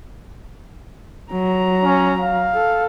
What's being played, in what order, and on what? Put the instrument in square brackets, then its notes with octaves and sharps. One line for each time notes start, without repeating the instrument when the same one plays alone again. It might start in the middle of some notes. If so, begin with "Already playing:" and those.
[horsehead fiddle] F#3 A#5
[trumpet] C#4
F5
[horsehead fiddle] A4